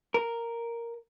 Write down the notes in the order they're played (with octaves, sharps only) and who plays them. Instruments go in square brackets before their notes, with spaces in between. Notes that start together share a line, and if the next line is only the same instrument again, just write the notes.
[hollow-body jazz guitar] A#4